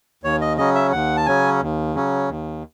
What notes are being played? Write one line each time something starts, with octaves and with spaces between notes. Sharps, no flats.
D#2 C#5
D#5
C#3 F#3 C#4 D#5
E5
D#2 F#5
A5
C#3 F#3 C#4 G#5
D#2
C#3 F#3 C#4
D#2